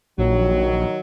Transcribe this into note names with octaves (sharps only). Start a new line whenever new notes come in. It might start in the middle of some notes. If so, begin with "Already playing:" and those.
A#1 D#3 F#3